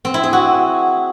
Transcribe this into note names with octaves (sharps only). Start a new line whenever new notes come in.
C4
E4
G#4
F#4